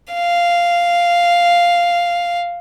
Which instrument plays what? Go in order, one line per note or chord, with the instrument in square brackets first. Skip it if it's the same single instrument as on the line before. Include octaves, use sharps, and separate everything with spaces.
[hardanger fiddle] F5